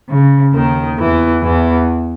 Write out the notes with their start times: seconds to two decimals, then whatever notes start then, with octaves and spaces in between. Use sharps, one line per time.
0.08 C#3
0.53 D#2 D#3
0.98 E2 E3
1.42 E2 E3